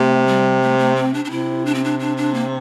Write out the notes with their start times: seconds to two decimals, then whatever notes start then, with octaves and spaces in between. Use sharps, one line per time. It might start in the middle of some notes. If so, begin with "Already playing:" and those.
Already playing: C3 A3
0.27 G3
0.62 A3
0.79 A3
0.96 C4
1.14 D4
1.25 D4
1.31 C3 E4
1.65 D4
1.74 C4
1.84 D4
2.00 D4
2.17 D4
2.34 A#3